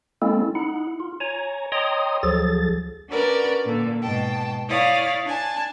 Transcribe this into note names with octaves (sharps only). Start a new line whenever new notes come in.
G#3 A#3 C4 C#4 E4 A4
D#4 E4 F#5
F4
C#5 G#5 A#5
C#5 D#5 G5 A#5 C6 D#6
D2 F3 F#3 G#4 A4 A6
C#4 D4 F#4 A#4 B4 D5
A#2 D3
G#2 B2 G5 A5
E4 C#5 D5 F5 D#6
D4 G#5 A5